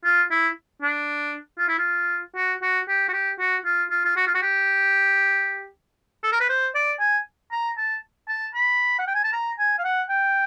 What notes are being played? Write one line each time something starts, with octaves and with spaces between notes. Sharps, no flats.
F4
E4
D4
F4
E4
F4
F#4
F#4
G4
F#4
G4
F#4
F4
F4
F4
F#4
F4
F#4
G4
A4
A#4
B4
C5
D5
G#5
A#5
A5
A5
B5
F#5
G5
G#5
A5
A#5
G#5
F5
F#5
G5